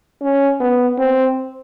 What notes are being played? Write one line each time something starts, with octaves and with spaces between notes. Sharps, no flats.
C#4
B3
C4